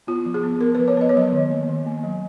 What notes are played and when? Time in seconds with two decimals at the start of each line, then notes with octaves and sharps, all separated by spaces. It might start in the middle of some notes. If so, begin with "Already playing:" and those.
0.07 B3 F4
0.26 F3
0.34 G#4
0.43 B3
0.61 B3 A#4
0.75 F3 B4
0.88 C#5
0.97 B3 D#5
1.09 C#5
1.15 F#3 D#5
1.32 D#3
1.50 A#3
1.68 D#3
1.86 A#3
2.04 F#3